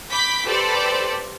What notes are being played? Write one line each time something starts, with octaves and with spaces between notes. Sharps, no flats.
B5 D6 G6 B6
G4 A4 B4 C5 D5